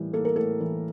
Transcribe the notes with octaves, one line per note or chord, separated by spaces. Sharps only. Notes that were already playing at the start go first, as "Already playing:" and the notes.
Already playing: A2 E3 G3 A#3
A#3 A4
A#4
A2 A4
E3